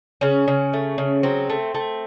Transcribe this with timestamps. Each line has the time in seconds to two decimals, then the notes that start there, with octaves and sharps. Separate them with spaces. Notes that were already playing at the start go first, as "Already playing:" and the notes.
0.21 C#3 C#4
0.48 C#3
0.73 A3
0.98 C#3
1.23 F#3 C4
1.49 A3
1.75 A3